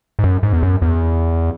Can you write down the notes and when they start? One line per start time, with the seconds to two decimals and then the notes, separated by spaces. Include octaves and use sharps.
0.19 G#2
0.24 F#2
0.43 G#2
0.53 E2
0.63 F#2
0.82 E2